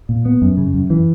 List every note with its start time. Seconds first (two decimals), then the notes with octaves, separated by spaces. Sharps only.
0.09 A#2
0.26 B3
0.42 F#2
0.57 C#3
0.74 F#2
0.90 E3